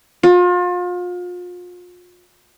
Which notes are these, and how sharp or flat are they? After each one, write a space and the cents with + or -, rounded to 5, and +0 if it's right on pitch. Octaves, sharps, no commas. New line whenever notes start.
F4 +35